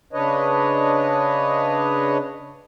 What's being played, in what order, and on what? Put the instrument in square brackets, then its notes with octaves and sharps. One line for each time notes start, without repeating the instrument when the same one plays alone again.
[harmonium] C#3 D4 B4 C#5 D#5